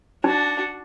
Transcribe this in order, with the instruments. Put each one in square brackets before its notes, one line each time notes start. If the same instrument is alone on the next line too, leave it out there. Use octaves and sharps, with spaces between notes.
[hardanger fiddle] D4 F#4 [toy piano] D#4